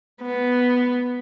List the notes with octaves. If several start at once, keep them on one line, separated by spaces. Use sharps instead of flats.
B3